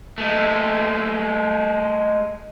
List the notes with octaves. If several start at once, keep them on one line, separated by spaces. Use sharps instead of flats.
G#3 A3